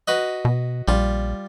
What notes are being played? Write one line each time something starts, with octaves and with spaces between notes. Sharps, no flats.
F#4 B4 D#5
B2
A#1 G3 F4